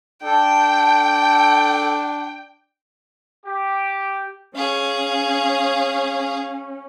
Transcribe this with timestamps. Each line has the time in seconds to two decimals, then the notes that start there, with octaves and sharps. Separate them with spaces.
0.23 D4 A4 G5
3.46 G4
4.55 C#4 G#4 F5